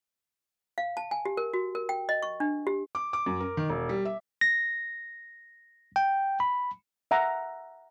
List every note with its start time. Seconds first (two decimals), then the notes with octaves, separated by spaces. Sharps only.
0.78 F5
0.97 A5
1.11 G#5
1.25 G4
1.37 A#4
1.54 F#4
1.75 A#4
1.89 G5
2.09 D#5
2.23 C#6
2.40 D4
2.67 G4
2.95 D6
3.13 D6
3.26 F#2
3.40 A#4
3.57 D#3
3.69 E1
3.89 G3
4.05 E5
4.41 A#6
5.96 G5
6.40 B5
7.11 E5 F#5 A#5